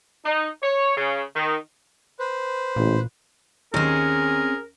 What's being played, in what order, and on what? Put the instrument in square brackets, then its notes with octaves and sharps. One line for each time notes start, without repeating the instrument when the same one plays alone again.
[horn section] D#4
C#5
C#3
D#3
[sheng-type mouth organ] B4 C5
[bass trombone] A1 [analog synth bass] A#2
[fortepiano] D#2 [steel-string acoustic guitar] C4 C#4 [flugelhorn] G#4 [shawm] A#4